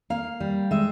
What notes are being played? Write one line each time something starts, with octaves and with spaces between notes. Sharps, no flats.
A#3 F5
G3
G#3 E5